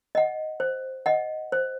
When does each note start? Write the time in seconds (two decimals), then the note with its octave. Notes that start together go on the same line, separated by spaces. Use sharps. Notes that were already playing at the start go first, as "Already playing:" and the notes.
0.15 D#5 F#5
0.60 C5
1.06 D#5 F#5
1.52 C5